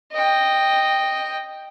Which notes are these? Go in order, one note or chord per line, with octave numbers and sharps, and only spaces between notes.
D#5 G5